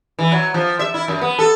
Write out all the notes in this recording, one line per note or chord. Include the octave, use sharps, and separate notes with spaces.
E3
F#3
F3
E5
E4
F#2
B3
A4